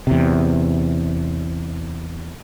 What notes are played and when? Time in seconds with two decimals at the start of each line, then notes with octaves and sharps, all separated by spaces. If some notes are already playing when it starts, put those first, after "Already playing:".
0.07 E2 C3